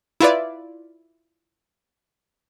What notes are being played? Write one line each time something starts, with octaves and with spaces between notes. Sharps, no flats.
E4 F4 B4 D5